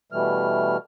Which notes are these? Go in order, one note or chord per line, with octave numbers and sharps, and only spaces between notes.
B2 E3 G3 A3 F6